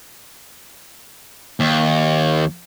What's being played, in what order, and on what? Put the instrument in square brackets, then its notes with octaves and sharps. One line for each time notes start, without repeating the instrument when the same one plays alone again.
[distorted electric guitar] D#2